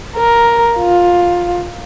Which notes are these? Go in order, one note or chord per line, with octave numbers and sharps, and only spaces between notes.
A#4
F4